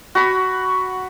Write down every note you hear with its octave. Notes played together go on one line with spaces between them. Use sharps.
F#4 B5